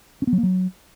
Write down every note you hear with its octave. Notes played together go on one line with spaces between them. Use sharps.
C#4
B3
F#3
A#3
F#3